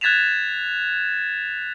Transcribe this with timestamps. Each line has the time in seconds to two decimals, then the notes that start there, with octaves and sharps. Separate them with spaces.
0.01 F#6 G#6 A6 B6 E7 F7